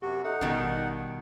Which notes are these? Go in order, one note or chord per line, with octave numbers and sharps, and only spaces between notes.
F#2 C3 F#4 G4
D#4 A4 E5 F#5
A1 B2 D#3 G3 F5 G5